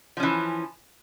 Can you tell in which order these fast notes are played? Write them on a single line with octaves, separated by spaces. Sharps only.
F3 C#4 E3